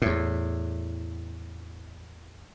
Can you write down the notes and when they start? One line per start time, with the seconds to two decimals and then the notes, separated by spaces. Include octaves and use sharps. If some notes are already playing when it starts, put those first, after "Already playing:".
0.02 E2 A2